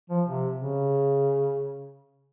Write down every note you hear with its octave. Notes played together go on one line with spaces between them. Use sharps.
F3
C3
C#3